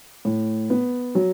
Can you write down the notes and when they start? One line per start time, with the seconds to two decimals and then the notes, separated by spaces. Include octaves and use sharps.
0.25 A2
0.70 B3
1.15 F#3